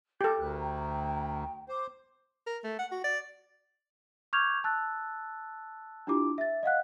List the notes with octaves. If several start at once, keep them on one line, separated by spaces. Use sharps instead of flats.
G4 A4 G6
D2 A#4 F#6
G5 A#5
C5 D6
A#4
A3
F#5
F#4
D5
C#6 D6 F6 G6 G#6 F7
A5 E6 F#6 A6
D4 E4 F4 G4 D6
E5 A6
D#5 F5 F#5 F#6